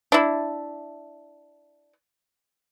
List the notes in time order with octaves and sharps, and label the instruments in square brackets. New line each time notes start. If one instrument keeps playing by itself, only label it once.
[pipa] D4 E4